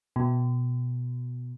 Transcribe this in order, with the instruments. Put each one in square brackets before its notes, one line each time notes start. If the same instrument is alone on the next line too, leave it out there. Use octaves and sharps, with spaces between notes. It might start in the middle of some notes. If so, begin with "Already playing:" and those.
[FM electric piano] B2